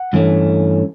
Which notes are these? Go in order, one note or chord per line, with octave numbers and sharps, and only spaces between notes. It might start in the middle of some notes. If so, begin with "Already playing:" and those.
Already playing: F#5
G2 E3 A3 C#4